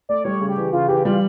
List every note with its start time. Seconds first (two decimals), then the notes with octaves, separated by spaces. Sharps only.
0.09 A3 D5
0.24 G3 C#5
0.41 C#3
0.49 G4
0.57 E3
0.73 C#3 F4
0.88 E3 G4
1.05 G3 F4